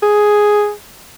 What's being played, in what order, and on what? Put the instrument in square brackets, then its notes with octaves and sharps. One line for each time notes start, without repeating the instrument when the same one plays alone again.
[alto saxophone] G#4